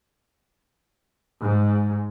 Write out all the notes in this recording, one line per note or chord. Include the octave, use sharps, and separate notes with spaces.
G#2